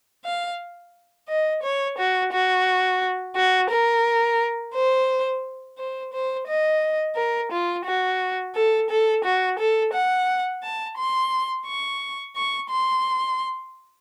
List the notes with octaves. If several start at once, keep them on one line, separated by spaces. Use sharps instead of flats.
F5
D#5
C#5
F#4
F#4
F#4
A#4
C5
C5
C5
D#5
A#4
F4
F#4
A4
A4
F#4
A4
F#5
A5
C6
C#6
C#6
C6